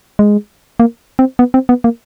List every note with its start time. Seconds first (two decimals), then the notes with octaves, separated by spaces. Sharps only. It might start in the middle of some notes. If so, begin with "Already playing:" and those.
0.19 G#3
0.80 A#3
1.19 C4
1.39 B3
1.54 C4
1.69 B3
1.84 A#3